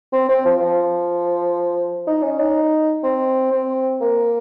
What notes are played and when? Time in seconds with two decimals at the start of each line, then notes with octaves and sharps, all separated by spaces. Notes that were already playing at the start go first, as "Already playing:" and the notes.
0.13 C4
0.29 C4
0.45 F3
0.61 F3
2.07 D#4
2.22 C#4
2.39 D#4
3.03 C4
3.52 C4
4.01 A#3